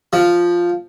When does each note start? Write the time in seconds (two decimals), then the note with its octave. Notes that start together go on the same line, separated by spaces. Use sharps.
0.13 F3